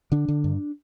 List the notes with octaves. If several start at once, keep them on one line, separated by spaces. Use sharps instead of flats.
D3 D4
D3
G2